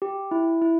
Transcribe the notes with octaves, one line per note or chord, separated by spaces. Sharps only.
G4
E4
E4